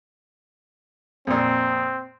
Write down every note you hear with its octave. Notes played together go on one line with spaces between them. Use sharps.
F2 A#2 C4